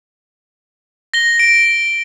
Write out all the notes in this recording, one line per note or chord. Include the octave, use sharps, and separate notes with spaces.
A#6 G7
D7